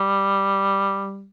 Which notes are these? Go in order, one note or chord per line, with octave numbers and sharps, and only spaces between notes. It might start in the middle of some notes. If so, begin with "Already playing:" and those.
Already playing: G3